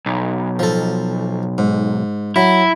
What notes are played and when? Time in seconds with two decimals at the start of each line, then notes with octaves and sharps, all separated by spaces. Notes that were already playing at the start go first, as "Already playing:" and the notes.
0.06 B1
0.59 F3 A4
1.58 G#2
2.36 F#3 E4